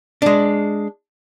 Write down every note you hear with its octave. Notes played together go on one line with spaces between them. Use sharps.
G#3 D4